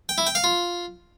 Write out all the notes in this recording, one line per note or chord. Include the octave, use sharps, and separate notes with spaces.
G5
E4
G5
F5
F4